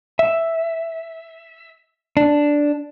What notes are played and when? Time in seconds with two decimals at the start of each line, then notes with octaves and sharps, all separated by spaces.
0.19 E5
2.17 D4